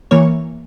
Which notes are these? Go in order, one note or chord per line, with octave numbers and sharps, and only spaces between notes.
E3 A#3 C#5